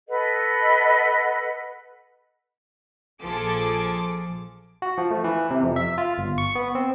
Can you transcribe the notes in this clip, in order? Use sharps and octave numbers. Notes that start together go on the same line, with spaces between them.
A4 B4 D#5 F#5
A#1 F3 G#4 A4 D6
F#4
F3
A3
E3
C3
F2
E5
F4
G1
C#6
B3
C4